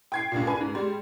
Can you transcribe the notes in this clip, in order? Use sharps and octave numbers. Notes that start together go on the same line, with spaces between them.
G5 G#6 C7
C#2 G2 A#2
B4 G#5
G#2
G3 G#3